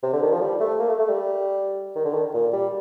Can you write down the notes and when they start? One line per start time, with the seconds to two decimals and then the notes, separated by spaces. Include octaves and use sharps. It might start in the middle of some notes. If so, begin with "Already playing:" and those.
0.03 C3
0.13 D3
0.23 D#3
0.32 F3
0.41 G3
0.61 A3
0.79 A#3
0.89 A3
1.00 A3
1.09 G3
1.95 D#3
2.05 D3
2.14 D#3
2.34 A#2
2.53 G3